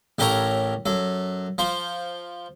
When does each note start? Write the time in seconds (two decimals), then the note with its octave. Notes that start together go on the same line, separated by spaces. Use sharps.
0.19 A1 G4 A4 A#4 C#5 A#5
0.86 F#2 A4
1.58 F3 C5